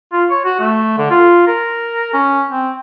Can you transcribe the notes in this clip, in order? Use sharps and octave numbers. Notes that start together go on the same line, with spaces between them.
F4
C#5
F#4
A3
D3
F4
A#4
C#4
C4